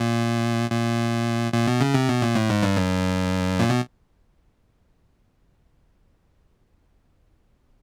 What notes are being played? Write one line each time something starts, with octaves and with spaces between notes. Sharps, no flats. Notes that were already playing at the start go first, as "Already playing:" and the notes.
Already playing: A#2
A#2
A#2
B2
C#3
C3
B2
A#2
A2
G#2
G2
F#2
A#2
B2